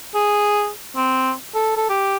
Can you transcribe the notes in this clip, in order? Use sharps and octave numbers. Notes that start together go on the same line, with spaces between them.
G#4
C4
A4
A4
G4